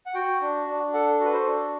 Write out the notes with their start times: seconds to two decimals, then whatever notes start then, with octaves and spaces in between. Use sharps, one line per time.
0.06 F#5
0.15 F#4 G5
0.41 D4
0.67 D4
0.94 A4 F#5
1.20 F#4
1.25 B4
1.33 C5
1.47 D4